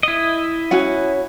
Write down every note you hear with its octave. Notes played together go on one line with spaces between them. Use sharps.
E4 D#5
C#4 F#4 F#5